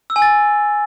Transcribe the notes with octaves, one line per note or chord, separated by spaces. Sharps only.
E6
G#5
A6